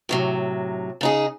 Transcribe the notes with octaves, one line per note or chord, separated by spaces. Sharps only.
A2 C3 F#3
C#3 D#4 G#4